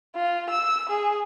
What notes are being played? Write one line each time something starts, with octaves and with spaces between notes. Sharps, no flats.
F4
E6
G#4